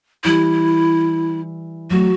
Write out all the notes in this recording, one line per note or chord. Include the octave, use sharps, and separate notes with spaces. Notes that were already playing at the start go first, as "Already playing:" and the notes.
E3 G3 E4
F#3 A3 F#4